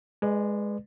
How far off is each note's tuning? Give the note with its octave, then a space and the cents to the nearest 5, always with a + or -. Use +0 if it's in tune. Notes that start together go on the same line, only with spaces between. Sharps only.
G#3 +0 B4 +0 D5 +35